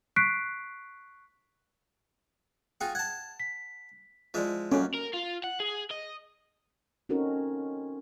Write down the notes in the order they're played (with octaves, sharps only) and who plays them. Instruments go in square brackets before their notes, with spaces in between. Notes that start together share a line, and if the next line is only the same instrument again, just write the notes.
[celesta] C#6 F#6 B6 C7 D7
[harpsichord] F4 F#4 G#4 [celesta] G5
[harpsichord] F#5 A5 [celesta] G#6
[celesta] B6
[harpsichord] F3 G#3 E4 [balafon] F4 D5
[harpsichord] F#2 A#3 [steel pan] C#4 [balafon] F#4 A4
[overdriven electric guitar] A#4
F4
F#5
G#4
D#5
[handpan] C4 C#4 D#4 F#4 A4 A#4